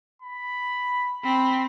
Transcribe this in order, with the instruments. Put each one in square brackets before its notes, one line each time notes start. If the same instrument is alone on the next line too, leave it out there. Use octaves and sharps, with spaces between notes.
[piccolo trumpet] B5
[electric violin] C4 [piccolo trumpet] B5